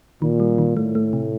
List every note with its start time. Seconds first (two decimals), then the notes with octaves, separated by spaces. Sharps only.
0.22 A#2 D#3
0.40 G3
0.58 D#3
0.76 A2 A3
0.95 A3
1.13 C3